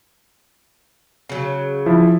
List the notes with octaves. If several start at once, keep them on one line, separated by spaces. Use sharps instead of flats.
C#3 F#3
F3 E4